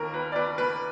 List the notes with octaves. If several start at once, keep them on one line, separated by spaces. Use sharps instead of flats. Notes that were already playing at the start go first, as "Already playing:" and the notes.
Already playing: D#2 D#3 A#4
B4
D5
B4
B4